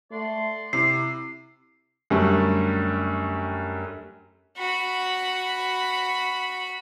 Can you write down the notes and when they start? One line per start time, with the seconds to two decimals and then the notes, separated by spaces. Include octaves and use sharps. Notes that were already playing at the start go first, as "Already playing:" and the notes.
0.11 A3 D5 F#5 C6
0.73 C3 E4 C7
2.10 F#2 D3 G3 A3
4.57 F#4 B5